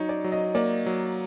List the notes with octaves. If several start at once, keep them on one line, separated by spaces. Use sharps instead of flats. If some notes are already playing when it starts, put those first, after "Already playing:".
Already playing: F#3 D#4 C#5
D5
F#3
D#5
A#3 D5
F#3